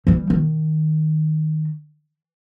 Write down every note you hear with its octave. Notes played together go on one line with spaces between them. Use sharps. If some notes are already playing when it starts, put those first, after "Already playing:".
E3 G3
D#3